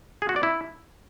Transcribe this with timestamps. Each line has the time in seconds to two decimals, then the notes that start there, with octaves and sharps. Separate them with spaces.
0.22 G#4
0.29 F#4
0.36 D5
0.43 E4